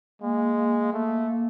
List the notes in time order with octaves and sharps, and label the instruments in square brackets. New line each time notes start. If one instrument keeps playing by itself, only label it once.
[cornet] G#3 [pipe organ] A#3
[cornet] A3 [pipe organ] A#3